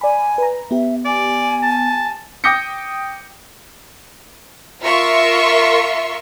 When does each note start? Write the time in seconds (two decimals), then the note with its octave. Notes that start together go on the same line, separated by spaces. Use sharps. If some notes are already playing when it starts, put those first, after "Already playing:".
0.01 D5 G#5 B5
0.38 B4 A#5
0.71 B3 G4 E5
1.05 D5 G#5
1.63 A5
2.44 G5 D6 D#6 G6 A#6 C#7
4.83 F4 A#4 E5 C6 C#6